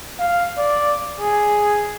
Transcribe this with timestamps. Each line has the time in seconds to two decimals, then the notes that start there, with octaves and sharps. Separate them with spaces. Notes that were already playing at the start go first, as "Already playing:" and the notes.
0.19 F5
0.58 D5
1.20 G#4